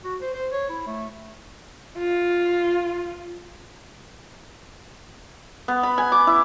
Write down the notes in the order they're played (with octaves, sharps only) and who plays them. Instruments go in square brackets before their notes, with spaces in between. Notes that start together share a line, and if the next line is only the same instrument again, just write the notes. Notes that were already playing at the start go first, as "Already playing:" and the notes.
[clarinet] F#4
C5
C5
C#5
E4
A3
[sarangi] F4
[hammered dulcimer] B3
B5
G#5
D6
E4